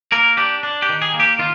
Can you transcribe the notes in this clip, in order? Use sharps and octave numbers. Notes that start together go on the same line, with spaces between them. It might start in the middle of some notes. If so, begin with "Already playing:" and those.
A#3 A#4
D4 G4
D4
G4
D#3
G#4
A#3
G4
D#3 F4